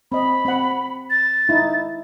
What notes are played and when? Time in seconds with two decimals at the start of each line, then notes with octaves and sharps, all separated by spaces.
0.12 C4 D#5 B5
0.45 C4 F#5
1.10 A6
1.49 D#4 E4